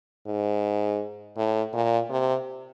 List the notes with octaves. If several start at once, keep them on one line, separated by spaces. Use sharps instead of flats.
G#2
A2
A#2
C3